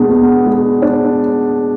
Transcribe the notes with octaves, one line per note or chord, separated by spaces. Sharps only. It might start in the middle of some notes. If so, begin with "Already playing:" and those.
Already playing: B2 G#3 D4
B3
G#3
D4